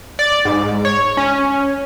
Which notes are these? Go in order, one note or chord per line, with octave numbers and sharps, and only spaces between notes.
D5
G#2
C#5
C#4